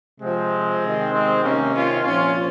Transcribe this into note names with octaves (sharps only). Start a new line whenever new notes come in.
C3 F3 G#3 C4
C3 D#3
G#3 C4
C3 D#3 A#3 C#4
C#4 F4
A#2 F3 C#4 F4